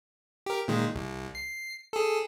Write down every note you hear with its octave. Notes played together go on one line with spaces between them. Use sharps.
G4 A#4
A#2 D#3 G#3
C2
C7
G#4 A4